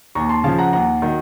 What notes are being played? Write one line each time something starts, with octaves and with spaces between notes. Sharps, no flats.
D#2 A#5 C#6
A5 C6
C#3 F3 F5 A5
F#5 A#5
D#2 F#5 A#5
D#3 F#3